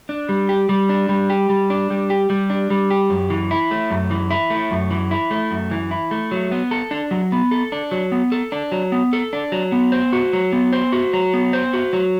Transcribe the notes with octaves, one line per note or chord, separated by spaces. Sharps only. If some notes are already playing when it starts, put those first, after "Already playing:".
D4
G3
G4
G3
D4
G3
G4
G3
D4
G3
G4
G3
D4
G3
G4
F#2
E3
E4
A3
F#2
E3
E4
A3
F#2
E3
E4
A3
F#2
E3
E4
A3
F#3
B3
A4
D4
F#3
B3
A4
D4
F#3
B3
A4
D4
F#3
B3
A4
D4
F#3
B3
C5
F#4
F#3
B3
C5
F#4
F#3
B3
C5
F#4
F#3